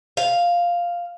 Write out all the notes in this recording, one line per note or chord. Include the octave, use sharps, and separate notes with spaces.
F5